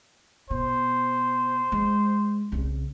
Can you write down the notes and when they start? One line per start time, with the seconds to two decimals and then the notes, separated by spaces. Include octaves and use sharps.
0.50 B2 C5
1.72 G#3
2.52 C2 C#3